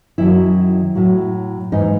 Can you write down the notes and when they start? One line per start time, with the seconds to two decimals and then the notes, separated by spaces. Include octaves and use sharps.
0.18 F#2 D#3 F#3 E4
0.95 A2 F#3
1.72 G#2 E3 D#4